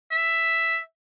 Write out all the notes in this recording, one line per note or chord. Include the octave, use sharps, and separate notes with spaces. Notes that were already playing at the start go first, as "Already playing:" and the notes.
E5